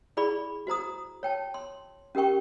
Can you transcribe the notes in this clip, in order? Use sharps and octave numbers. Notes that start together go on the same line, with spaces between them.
E4 G#4 D5 B5 C#6
F#4 C5 A#5 D#6
C#5 G5 A5
C6
C#4 G4 A#4 G5 C#6